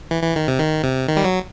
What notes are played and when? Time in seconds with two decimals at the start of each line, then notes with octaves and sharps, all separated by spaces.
0.11 E3
0.23 E3
0.36 D#3
0.48 C3
0.60 D#3
0.84 C3
1.08 D#3
1.17 G3
1.24 F#3